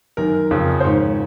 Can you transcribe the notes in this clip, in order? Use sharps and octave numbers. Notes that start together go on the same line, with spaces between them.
F#2 D#3 A#4
F2 C#3
C5
G#2 D#3 C#5